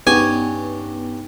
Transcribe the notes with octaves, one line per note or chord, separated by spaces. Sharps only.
G2 B3 C#4 D#4 G4 C#5 G#5